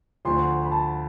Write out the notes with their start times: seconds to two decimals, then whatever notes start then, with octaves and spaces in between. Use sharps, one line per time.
0.25 D2 D3 F3 C6
0.65 B5
0.71 A5